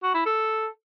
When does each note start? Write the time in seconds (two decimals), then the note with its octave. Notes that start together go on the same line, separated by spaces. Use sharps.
0.03 F#4
0.15 E4
0.26 A4